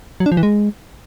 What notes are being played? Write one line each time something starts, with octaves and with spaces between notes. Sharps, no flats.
F#3
D4
F3
E3
G#3